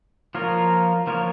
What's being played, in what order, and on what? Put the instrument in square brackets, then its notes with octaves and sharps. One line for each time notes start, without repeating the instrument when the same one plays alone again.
[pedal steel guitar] F3 A#3 F4 A#4 C#5
F3 A#3 F4 A#4 C#5